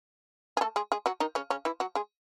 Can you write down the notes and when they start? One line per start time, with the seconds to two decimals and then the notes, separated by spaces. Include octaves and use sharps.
0.57 G#4
0.61 A3 A4
0.76 G#3 G#4
0.92 G#3 G#4
1.06 F#3 F#4
1.20 D#3 D#4
1.35 C#3 C#4
1.50 C#3 C#4
1.65 E3 E4
1.80 F#3 F#4
1.95 G#3 G#4